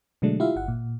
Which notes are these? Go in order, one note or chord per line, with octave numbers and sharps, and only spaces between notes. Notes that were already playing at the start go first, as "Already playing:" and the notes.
B2 D3 F#3 G#3 A3 D4
E4 F4 G4 E5 F5
G1 F#5
A#2